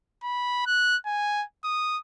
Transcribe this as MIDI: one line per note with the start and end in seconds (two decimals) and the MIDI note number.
0.23 0.62 83
0.66 0.97 90
1.06 1.44 80
1.64 1.98 87